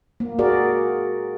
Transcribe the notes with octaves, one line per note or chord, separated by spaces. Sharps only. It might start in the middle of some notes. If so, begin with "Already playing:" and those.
A#3
F#4 G#4 A#4 D5